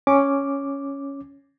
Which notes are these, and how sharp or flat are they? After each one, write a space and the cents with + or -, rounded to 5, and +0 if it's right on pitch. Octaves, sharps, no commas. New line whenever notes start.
C#4 +0 D6 +0